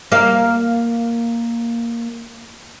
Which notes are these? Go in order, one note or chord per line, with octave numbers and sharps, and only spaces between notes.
A#3 F5